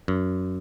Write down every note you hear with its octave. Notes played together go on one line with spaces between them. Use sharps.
F#2